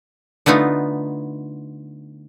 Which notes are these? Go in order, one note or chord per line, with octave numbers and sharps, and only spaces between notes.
D3 A3 B3 D#4 F4